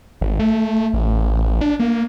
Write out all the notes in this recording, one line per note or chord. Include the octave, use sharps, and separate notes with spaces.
G#1
A3
A1
D4
A#3